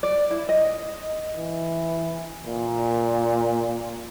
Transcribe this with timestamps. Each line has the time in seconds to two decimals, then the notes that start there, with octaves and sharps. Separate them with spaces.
0.03 D5
0.31 E4
0.49 D#5
1.37 E3
2.46 A#2